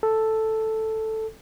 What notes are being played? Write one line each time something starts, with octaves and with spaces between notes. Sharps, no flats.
A4